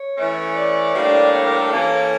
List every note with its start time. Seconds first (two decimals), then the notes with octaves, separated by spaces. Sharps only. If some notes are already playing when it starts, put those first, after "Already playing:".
Already playing: C#5
0.16 E3 A3 C#4
0.54 D5
0.94 A2 G3 A#3 D4
1.33 C#5
1.47 A#4
1.59 A4
1.72 E3 A#3 C#4